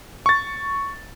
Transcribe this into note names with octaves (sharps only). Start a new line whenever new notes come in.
C#6 A6